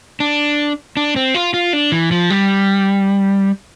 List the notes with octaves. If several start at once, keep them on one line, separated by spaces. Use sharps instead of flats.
D4
D4
C4
F4
F4
D4
E3
F3
G3